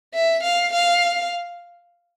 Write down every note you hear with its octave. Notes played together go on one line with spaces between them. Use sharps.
E5
F5
F5